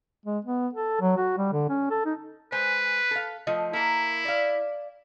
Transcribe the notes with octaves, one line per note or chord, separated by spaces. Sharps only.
G#3
B3
A4
F#3
F#4
G3
D3
C#4
A4
D#4
G#3 B4 C5 G#5
A4 F5
F3 A3 D#5
A#3 E4 A#4
D5 F5